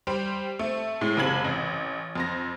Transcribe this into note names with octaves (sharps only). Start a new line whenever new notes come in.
G3 G4 C5
A3 C4
A2 G#3
F#1 C3 G#3 B5 G#6 F#7
A1
F2 C6 A#6